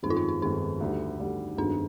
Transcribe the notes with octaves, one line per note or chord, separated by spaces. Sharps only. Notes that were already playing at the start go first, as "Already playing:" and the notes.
G1 F2 D#3 G#3 D#4
F4
D#4
D#4
G1 F2 D#3 G#3 D#4
D2 D3 G3
D2 D3 G3
G1 F2 D#3 G#3 D4